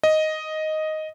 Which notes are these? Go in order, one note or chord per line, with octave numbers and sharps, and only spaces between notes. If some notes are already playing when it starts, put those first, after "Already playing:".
D#5